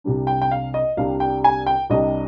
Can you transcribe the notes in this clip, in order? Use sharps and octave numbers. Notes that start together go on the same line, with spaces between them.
C2 C3 G3 D4
G5
G5
F5
D#5
C2 C3 G3 D4 F5
G5
G#5
G5
C2 C3 G3 D4 D#5